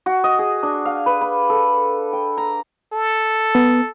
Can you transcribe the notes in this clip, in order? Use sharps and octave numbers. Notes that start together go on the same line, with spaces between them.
F#4
D#5
G#4
D4
F5
B4
B5
A4
G5
A#5
A4
B3